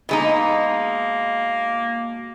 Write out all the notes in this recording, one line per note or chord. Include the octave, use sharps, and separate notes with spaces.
B2 G#3 A#3 D#4